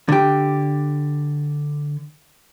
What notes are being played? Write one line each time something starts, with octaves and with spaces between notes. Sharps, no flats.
D3 G4